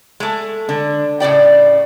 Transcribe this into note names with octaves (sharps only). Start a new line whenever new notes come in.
G#3 A3
D3
A2 C#3 D5 G5